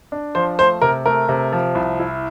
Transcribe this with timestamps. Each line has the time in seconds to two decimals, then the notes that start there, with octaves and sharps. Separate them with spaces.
0.12 D4
0.35 F3 C5
0.58 A3 C5
0.82 C3 A#4
1.06 A3 A#4
1.29 C3
1.52 F3
1.75 C2
2.00 E4